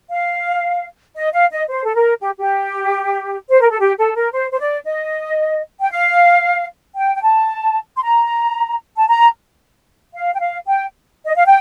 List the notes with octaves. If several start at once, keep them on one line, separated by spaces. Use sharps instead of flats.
F5
D#5
F5
D#5
C5
A4
A#4
G4
G4
C5
A#4
A4
G4
A4
A#4
C5
C5
D5
D#5
G5
F5
G5
G5
A5
C6
A#5
A5
A#5
F5
G5
F5
G5
D#5
F5
G5